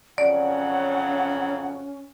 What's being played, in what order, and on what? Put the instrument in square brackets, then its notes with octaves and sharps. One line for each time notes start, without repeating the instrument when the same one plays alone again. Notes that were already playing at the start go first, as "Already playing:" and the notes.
[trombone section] F2 C#3 F#3 [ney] C#4 [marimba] D5 [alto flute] F#5